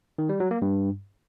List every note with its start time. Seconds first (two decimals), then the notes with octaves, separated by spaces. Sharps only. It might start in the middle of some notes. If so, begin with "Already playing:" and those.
0.18 D#3
0.29 G3
0.40 F#3
0.51 A#3
0.62 G2